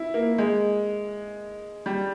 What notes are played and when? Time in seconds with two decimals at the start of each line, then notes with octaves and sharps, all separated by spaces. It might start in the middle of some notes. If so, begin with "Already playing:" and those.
Already playing: E4
0.14 A#3
0.38 G#3
1.86 G3